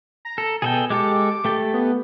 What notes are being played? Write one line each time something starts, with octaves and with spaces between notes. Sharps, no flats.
A#5
A4
B2 G#4 A4 G5
G#3 G4 A4 D6
A3 G4 A4
B3